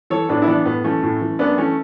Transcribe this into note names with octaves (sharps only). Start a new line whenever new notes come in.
E3 A4 C#5
A2 B3 D4
E4
E3 B3 D4
A2 B3
E3 A3 C#4
A2
E3
F#2 B3 D4
E3 A3 C#4